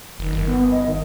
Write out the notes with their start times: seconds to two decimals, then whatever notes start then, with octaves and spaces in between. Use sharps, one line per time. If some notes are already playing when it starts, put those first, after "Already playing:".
0.19 F#1 D#3
0.33 G1
0.46 B3
0.71 D#5
0.86 D#3